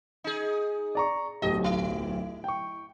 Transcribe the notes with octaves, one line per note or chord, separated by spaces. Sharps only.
D#4 G#4
D5 A#5 C#6
D1 B1 G4 D#5
E4
G5 C#6